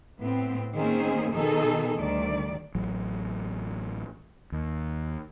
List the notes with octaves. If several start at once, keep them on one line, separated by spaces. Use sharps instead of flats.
A2 B3 C4
D#3 A#3 C4 C#4 G#4 C5
B2 D#3 D#4 G#4 A4
D2 D#3 G3 D5
A1 F#3
D#2